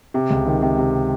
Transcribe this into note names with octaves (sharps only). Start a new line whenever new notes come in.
C3
C#2
D#3
C3
C3